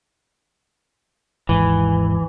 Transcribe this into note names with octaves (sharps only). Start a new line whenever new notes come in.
G#1 D#2 G#2 E3